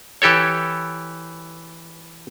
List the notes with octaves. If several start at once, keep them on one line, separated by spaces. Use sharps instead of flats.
E3 G4 A4 C#5